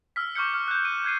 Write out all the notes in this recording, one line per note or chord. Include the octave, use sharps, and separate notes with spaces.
E6 F6 B6
C#6 D6 F6 G6 C#7
F6
F#6 G6
D#7
F#6 G#6 C7 D#7